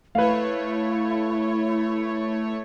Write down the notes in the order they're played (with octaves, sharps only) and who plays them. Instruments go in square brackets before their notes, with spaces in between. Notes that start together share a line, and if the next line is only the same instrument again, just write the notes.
[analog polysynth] A3 C#5 [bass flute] E4 [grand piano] B4 F5